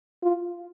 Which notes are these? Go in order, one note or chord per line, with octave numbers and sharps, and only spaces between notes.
F4